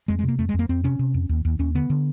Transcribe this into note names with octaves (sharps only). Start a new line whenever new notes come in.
F2 G#3
G#3
C3 A#3
F2 A3
G#3
F2
A#3
F2 C4
C3 C#4
C3
F2
D#2
D#2
D#2 C#4
D3 B3
D3